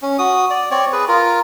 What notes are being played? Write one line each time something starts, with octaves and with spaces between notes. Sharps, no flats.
C#4
F#4 D#6
D5
C4 C#5 D5
G#4 B4
F4 A#4